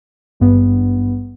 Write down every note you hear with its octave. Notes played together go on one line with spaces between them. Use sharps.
G#1 G2 B3